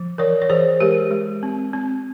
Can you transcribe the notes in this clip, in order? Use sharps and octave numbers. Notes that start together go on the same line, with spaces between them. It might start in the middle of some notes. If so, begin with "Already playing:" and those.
Already playing: F3
E3 A#4 C#5
C#5
E3 G#4 C5
G#3 G4 A#4
G#3
C4
C4